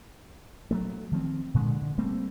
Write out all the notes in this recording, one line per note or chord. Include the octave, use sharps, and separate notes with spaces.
F#3 G#3 A3
D#3 F3 A3 C4
A#2 D3 G#3
D3
G3 A3 A#3 C4